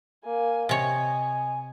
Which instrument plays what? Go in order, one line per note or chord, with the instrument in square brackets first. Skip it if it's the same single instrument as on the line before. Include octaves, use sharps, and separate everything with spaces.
[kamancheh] A#3 G#5
[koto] C3 C#5 [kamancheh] D#5 [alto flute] G#5